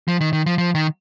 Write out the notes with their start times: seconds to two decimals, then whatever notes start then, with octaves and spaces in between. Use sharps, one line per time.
0.08 F3
0.21 D#3
0.33 D#3
0.46 F3
0.58 F3
0.75 D#3